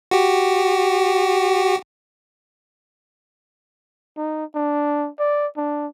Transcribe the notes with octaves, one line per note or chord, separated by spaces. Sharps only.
F#4 G4
D#4
D4
D5
D4